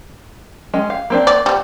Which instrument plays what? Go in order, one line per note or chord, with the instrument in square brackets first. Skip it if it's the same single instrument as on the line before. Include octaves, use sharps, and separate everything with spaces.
[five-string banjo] G#3 C#4 D#5
F5
A#3 C4 D4
[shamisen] D5
F3 G3